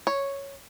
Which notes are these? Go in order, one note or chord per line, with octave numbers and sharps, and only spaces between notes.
C#5